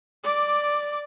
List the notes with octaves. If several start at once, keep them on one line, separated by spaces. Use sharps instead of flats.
D5 D6